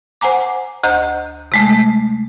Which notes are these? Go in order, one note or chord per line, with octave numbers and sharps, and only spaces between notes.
C5 F#5 G#5 A#5 D6
D2 C5 D#5 A#5 G6
C3 G#3 A3